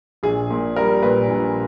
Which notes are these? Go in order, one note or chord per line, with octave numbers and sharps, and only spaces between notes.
A#1 G#4
A#2
G3 A#4
A#2 B4
A#1